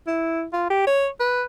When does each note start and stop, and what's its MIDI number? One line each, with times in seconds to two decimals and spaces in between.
0.07 0.45 64
0.53 0.70 65
0.70 0.84 67
0.87 1.08 73
1.20 1.44 71